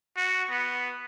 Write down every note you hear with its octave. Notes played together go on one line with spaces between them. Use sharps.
F#4
B3